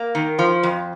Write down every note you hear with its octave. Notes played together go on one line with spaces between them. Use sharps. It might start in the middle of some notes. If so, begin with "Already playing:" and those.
Already playing: A#3
D#3
F3
F2